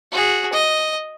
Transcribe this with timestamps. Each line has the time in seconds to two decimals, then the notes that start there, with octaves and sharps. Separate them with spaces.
0.12 F#4 G#4
0.53 D#5